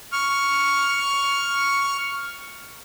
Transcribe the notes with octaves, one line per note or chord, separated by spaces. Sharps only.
C#6 F6